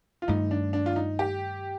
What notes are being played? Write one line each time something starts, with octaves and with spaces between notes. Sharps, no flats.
F4
G2 D#3 A3 D#4
D4
D4
F4
D#4
G4